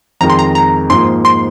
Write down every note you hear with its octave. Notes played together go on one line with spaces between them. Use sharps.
F2 D#3 G#3 A#5
C6
A#5
A#5
G#2 F3 A#3 C6
C6